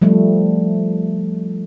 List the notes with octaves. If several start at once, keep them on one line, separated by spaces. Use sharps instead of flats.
F3 G3 A3